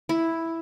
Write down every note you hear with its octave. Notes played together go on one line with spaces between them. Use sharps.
E4